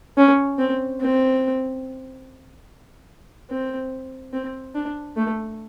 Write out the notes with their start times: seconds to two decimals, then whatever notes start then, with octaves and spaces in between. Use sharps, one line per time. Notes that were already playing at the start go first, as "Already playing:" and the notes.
0.17 C#4
0.59 C4
1.01 C4
3.51 C4
4.33 C4
4.75 D4
5.16 A3